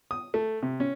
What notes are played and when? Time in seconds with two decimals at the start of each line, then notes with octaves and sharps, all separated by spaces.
0.11 D#6
0.34 A3
0.63 C3
0.80 C#4